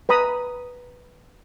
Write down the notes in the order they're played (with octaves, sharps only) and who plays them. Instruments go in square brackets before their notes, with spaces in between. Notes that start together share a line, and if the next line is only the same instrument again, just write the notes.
[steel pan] B4 A#5 B5 D#6